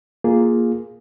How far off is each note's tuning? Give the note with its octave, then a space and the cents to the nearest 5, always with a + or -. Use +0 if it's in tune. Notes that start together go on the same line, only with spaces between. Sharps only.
A#3 +0 F4 +0 G#4 +0